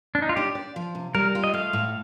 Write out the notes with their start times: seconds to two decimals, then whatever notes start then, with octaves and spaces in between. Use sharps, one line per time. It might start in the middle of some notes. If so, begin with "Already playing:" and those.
0.15 D4
0.22 D#4
0.29 F4
0.36 D4 G4
0.55 D5
0.76 F3
0.95 C3
1.14 G3 A#4
1.35 F4
1.44 D#5
1.54 A3 F5
1.73 A2